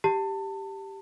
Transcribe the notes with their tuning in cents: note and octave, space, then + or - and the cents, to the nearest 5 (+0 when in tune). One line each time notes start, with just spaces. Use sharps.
G4 +0 A5 +25